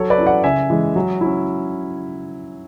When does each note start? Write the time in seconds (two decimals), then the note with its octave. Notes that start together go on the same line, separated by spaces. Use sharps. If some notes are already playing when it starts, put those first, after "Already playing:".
Already playing: F#3 A4 C#5
0.10 B4 D5
0.18 C#4 E4
0.26 D5 F#5
0.44 C#3 E5 G#5
0.70 E3 G#3
0.96 F#3
1.21 E4
1.26 C#4